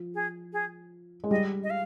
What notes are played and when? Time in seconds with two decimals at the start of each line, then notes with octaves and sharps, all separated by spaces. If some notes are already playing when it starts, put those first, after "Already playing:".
Already playing: F3
0.15 G#4
0.53 G#4
1.24 G#3
1.31 G3 D#5
1.63 D#5
1.70 F5